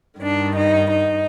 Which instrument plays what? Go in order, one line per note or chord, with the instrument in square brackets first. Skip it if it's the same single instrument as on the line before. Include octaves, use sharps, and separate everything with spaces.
[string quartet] G2 D#3 D4
D#4
D#4